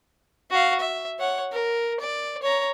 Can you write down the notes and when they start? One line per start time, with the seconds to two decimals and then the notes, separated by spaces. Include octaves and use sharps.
0.51 F#4 F5
0.80 E5
1.20 C#5 F#5
1.52 A#4
2.00 D5
2.42 C#5 A#5